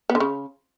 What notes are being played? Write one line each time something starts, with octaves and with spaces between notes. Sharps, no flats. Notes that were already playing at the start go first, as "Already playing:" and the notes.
B3
D3
C#3